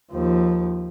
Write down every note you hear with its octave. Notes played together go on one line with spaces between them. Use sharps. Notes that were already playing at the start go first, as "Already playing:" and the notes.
D#2 F3